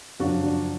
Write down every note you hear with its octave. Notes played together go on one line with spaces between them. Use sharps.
F#2 C#3 F3 D4 F#4
D4